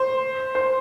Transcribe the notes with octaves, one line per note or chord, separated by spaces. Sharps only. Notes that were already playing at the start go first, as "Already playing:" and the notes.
Already playing: C5 C6
C5 C6